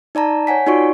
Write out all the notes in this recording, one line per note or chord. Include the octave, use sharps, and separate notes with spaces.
D#4 D5 A5 A#5
C#5 F#5 G#5 B6
D#4 F4 F#4 D5 C#6 D7